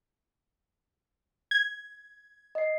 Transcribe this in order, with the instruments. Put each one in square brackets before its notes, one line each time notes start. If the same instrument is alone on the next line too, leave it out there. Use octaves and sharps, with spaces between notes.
[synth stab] G#6
[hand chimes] D#5 C7